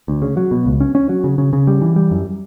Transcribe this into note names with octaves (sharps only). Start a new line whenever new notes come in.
D2
C#3
F#3
B2
C#2
C#4
C#4
F#3
C#3
C#3
C#3
G3
E3
G3
F#2